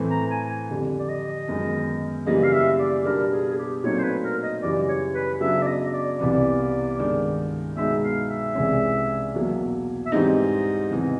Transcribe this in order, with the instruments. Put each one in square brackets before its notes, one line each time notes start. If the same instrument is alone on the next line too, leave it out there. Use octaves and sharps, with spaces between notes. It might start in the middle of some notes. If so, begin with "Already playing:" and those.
Already playing: [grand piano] A2 E3 A3 C4
[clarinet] A#5
G#5
G#5
[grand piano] F2 D3 G3
[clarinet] D5
D#5
[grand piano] F#2 D#3 G#3 B3
[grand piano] F#2 C#3 E3 G3 A#3 [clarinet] D#5
[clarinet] F5
E5
D5
[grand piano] B2 G3 B3 D4 [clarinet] A#4
[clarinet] G#4
G#4
G4
[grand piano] A#2 F#3 A3 C4 D#4 [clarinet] C#5
[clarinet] C5
B4
A#4
D#5
[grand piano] F#2 C#3 E3 G3 [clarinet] D5
[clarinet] C#5
B4
[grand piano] C#3 F#3 B3 D4 [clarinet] E5
[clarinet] D5
D#5
D5
[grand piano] C2 C3 E3 G3 B3 [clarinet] D5
[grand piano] G2 D#3 G#3
[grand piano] B2 G#3 B3 D#4 [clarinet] E5
[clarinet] F5
E5
[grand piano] C2 C3 E3 G#3 C#4
E2 B2 F#3 A#3
[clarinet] E5
[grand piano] G#2 E3 G3 C4 D#4 [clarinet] D#5
[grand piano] E2 C3 E3